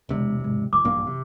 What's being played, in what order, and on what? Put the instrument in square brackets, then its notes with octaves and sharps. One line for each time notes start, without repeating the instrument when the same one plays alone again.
[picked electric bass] E1 C3 [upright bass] D2 G#3
[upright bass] G#2 F#3
[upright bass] F#2 E3 [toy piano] D6
[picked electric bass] A#1 G2 A#3
C3